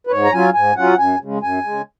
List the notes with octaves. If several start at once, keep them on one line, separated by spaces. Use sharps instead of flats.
B4
G#2 C#5
A#5
F#3 C#4 F4 G#5
G#2 G#5
F#3 C#4 F4 F#5
F#2 G#5
C#3 G#3
F#2 G#5
C#3 G#3